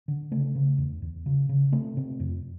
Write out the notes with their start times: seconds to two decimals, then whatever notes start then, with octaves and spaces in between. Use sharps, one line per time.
0.08 D3
0.31 C#3 A3
0.55 C#3
0.78 E2
1.02 E2
1.26 C#3
1.49 C#3
1.72 C3 A3
1.97 C3
2.20 F2